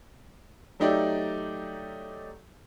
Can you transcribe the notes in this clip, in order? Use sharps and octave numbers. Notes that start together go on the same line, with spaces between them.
F#3 A3 D#4 G4 D5 E5